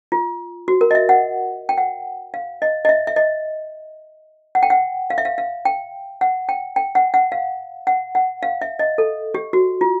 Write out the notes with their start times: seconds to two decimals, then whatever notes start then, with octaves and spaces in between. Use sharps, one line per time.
0.12 F4
0.68 F#4
0.81 A#4
0.91 D#5
0.95 E5
1.09 F#5
1.69 G5
1.78 F#5
2.34 F5
2.62 D#5
2.85 D#5
2.89 E5
3.07 E5
3.16 D#5
4.55 F#5
4.63 G5
4.70 F#5
5.10 F5
5.18 E5
5.25 F5
5.38 F5
5.65 G5
6.21 F#5
6.49 G5
6.76 G5
6.95 F#5
7.14 F#5
7.32 F5
7.87 F#5
8.15 F#5
8.43 F5
8.61 E5
8.79 D#5
8.98 A4
9.34 G4
9.53 F#4
9.81 F4